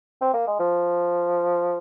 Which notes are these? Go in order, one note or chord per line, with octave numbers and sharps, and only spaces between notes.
C4
A#3
G#3
F3